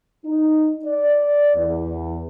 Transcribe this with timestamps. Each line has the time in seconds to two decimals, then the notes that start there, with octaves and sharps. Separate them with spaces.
0.25 D#4
0.85 D5
1.55 E2